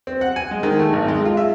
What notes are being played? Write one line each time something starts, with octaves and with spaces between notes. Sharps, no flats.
C4
F#5
G#5
G#3
D#3
A3
G#1
G#3
F4
E5